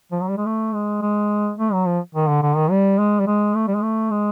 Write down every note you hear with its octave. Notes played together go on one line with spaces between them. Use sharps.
F3
F#3
G3
G#3
A3
G#3
G#3
A3
F#3
F3
D#3
D3
D3
D#3
G3
G#3
G3
G#3
A3
G3
G#3
A3
G#3